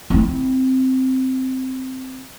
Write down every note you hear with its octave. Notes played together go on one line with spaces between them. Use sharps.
C4 E4